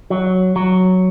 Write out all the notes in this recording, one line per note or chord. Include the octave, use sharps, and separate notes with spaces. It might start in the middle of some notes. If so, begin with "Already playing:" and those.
F#3
F#3